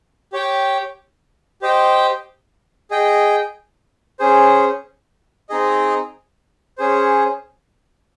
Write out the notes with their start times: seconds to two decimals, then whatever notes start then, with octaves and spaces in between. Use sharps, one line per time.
0.32 G4 C#5 G5
1.62 G4 C5 D#5 G5
2.91 G#4 D#5 G5
4.19 C#4 G#4 C5
5.49 C4 D#4 G#4 D#5
6.78 C#4 G#4 C5